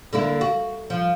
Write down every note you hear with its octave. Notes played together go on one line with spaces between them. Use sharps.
D3 A#3 E4
F#4
F3